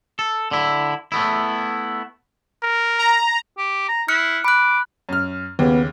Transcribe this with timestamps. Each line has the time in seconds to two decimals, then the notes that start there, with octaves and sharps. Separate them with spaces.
0.19 A4
0.51 D3 E4
1.12 A3 B3 E4
2.63 A#4
2.99 A#5
3.58 G4
3.89 A#5
4.08 E4 F6 F#6 C#7
4.44 B5 D6 F#6
5.09 F#2 F6
5.59 D#2 C#3 B3